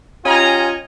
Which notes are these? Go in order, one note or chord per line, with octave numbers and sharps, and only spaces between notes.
C#4 F4 G4 D#5 G#5 A#5